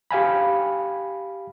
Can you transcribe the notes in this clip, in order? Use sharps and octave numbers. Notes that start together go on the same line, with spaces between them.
G4 F5 G#5 B5